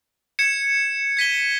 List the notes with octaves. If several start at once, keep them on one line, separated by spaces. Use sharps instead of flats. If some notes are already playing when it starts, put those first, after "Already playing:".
G#6 C#7 E7
G#6 B6 D#7 G7